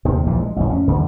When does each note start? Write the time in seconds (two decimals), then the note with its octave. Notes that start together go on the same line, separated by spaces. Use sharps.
0.05 D#2 C3 D#3
0.26 A#1 A#2 E3 F3
0.39 G#3
0.56 A1 F2
0.70 C#4
0.87 F#2 D3 E3